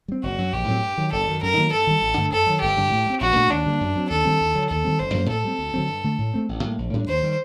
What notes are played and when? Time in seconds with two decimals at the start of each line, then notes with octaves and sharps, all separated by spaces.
0.08 G3 C4
0.23 F#1 F#4
0.38 F#2 F#3
0.53 A#1 G4
0.68 A2 F#3 C4
0.82 G2
0.98 D#3 F#3
1.12 F#1 A4
1.27 F#2 D#3
1.42 F#2 A#4
1.57 D#3 F#3 A#3
1.72 G2 A4
1.87 D#3 G3
2.02 A1
2.17 G2 D3 A3
2.31 F#2 A4
2.46 D#3 F#3
2.61 G1 G4
2.77 G2 D3 G3
2.91 A2
3.06 G3
3.10 C4
3.21 A#1 F#4
3.36 A#2 A3 D4
3.51 D#2 D4
3.66 D3 G3 A#3
3.81 F#2
3.96 F#3 C4
4.10 D#2 A4
4.25 D#3 G3 C4
4.40 D#2
4.55 D3 F#3
4.69 D#2 A4
4.85 D#3 G3 C4
4.99 F#1 C5
5.14 F#2 F#3 A#3
5.30 A2 A4
5.44 G3 C4
5.59 D2
5.74 D3 F#3 C4
5.89 G2
6.04 D3 A3
6.18 A2
6.34 A3 C4
6.49 A1
6.64 A2 G3 A#3
6.78 A#1
6.93 A2 G3 D4
7.08 D#2 C5
7.23 D#3 G3